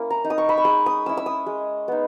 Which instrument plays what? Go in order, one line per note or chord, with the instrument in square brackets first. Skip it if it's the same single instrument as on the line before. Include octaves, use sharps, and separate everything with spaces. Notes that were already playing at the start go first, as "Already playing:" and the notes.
Already playing: [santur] A#3 C#4 E4
A#5
D#4
D#6
C#6
B5
C#6
G#3 D#6
D#6
C#4 E4 E6
E6
D#6
G#3
B3 D#4